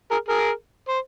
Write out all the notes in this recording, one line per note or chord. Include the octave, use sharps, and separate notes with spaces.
G#4 A#4
G#4 A#4
C5